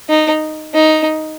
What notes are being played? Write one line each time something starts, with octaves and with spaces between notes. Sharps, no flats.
D#4
D#4